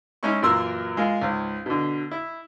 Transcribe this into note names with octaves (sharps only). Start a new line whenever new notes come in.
G#3 C#4 D#4 E4 C#6
F#2 A#2 E3 A#4 C6 E6
G#3 F4 A#4
C#2 G#2
B2 D3
E4